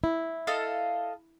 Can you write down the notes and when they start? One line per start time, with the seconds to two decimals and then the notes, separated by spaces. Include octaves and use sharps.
0.04 E4
0.47 A4 D#5 F5